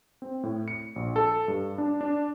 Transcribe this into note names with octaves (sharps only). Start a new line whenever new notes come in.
C4
A2
C#7
A#1
A4
G2
D4
D4